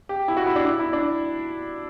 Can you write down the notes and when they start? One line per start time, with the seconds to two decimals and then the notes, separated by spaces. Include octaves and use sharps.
0.09 G4
0.28 E4
0.37 F#4
0.46 E4
0.56 D4
0.65 E4
0.79 E4
0.93 D4